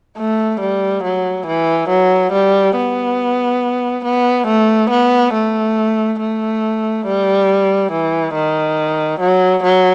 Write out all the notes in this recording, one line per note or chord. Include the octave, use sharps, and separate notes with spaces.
A3
G3
F#3
E3
F#3
G3
B3
B3
A3
B3
A3
A3
G3
E3
D#3
F#3
F#3